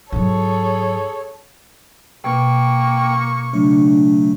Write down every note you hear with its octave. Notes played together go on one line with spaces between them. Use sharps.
G#2 F#3 G#4 A4 C#5
B2 A#3 G5 C#6
C#3 F#3 A3 D4